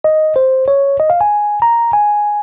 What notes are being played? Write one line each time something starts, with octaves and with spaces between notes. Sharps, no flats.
D#5
C5
C#5
D#5
F5
G#5
A#5
G#5